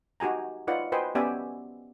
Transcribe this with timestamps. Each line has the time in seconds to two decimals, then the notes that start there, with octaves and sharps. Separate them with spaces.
0.20 D#4 F#4 G4 G#5 A#5
0.68 D#4 F4 B4 C#5 D5 F#5
0.92 F#4 B4 C5 D#5 G5 G#5
1.15 B3 C#4 G4 D5 E5 G#5